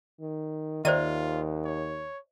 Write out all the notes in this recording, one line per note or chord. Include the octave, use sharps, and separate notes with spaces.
D#3
D#2 D#3 F4 C5 D5 E5 D#7
C#5